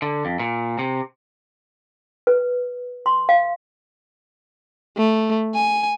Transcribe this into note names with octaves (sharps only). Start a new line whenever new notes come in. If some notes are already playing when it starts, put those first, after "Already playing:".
D3
F2
A#2
C3
B4
C6
F5
A3
G#5